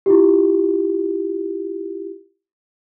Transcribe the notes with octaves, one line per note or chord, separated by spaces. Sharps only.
E4 F4 G4